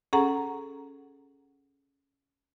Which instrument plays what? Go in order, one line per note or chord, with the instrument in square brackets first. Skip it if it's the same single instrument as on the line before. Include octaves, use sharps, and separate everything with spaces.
[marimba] C#4 G#4 A4 F#5 A#5